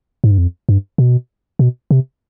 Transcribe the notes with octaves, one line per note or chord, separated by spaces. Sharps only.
G#2
G2
F2
G2
B2
B2
C3